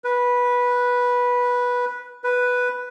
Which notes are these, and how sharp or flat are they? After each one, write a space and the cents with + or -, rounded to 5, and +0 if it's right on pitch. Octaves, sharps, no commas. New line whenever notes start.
B4 -10
B4 +0